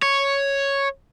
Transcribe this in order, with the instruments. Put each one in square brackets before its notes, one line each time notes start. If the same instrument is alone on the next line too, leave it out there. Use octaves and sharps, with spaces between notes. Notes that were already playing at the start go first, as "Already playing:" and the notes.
[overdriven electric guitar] C#5